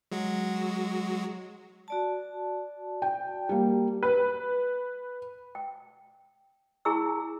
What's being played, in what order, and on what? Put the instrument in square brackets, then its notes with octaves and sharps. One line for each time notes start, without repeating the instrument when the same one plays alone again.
[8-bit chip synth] F#3 G#3 F#4
[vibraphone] F#4 D5 A5
[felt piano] G5
G3 A#3
[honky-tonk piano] B4
[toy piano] G5
E4 G#4 G#5 A#5 C#6 E6